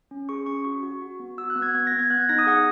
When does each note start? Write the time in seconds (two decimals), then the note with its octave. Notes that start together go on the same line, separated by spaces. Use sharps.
0.11 C#4
0.29 G#4 C#6
0.46 C#4 C#6
0.65 F#4 C#6
0.83 F#4
1.02 F#4
1.20 B3
1.38 F#4 E6
1.50 F#6
1.56 B3
1.62 G#6
1.74 B3 G#6
1.87 A#6
1.92 B3
1.99 G#6
2.10 B3 F#6
2.20 G#6
2.29 D#4 A#6
2.39 D#6
2.46 G#4 F#5